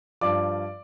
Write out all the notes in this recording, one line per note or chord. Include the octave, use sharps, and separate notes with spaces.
G2 F3 D5 D6